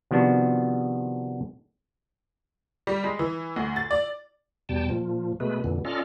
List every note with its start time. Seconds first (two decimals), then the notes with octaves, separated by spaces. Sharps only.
0.11 C3 D#3 F3 B3 D4 F#4
2.87 G3
3.04 G#3
3.19 E3
3.56 D2
3.76 A6
3.91 D5
4.69 E2 B2 G3 G5 A5
4.90 A#2 F3
5.40 B2 G#3 A3 B4
5.64 F2 A#2 D3 E3
5.85 C#4 F4 A4 D5 D#5 F6